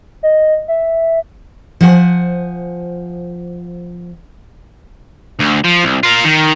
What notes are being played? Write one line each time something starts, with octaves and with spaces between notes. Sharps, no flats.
D#5
E5
F3 C5 F#5 G#5
D2
F3
C2
F4 A#4
D#3